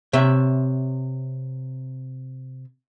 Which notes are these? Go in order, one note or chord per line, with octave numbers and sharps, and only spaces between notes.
C3 C#5 E5